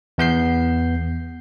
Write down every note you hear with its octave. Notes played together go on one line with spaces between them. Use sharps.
E2 B3 G6 C7